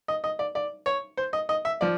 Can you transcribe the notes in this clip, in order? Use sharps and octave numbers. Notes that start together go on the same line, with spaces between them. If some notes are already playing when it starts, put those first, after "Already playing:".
D#5
D#5
D5
D5
C#5
C5
D#5
D#5
E5
F3 D5